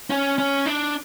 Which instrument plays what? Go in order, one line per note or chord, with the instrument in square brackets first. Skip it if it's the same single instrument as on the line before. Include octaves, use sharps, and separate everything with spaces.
[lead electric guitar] C#4
C#4
D4